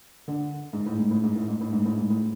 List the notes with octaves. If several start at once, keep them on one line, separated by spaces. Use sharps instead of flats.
D3
G#2
A2
G#2
A2
G#2
A2
G#2
A2
G#2
A2
G#2
A2